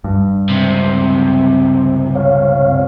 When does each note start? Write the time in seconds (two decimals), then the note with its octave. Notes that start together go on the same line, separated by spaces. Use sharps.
0.04 G2
0.49 C#2 C3
2.15 C#5 F5